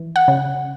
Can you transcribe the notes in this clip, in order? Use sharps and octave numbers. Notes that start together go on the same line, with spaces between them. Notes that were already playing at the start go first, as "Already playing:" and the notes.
Already playing: E3
F#5
C#3